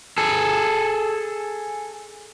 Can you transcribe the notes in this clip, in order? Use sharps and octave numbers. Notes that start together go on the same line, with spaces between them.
G#4 A4